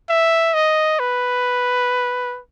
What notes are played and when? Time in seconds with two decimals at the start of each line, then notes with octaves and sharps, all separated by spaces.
0.09 E5
0.54 D#5
1.00 B4